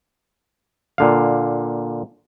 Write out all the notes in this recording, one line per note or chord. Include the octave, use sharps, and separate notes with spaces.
A#2 D3 F5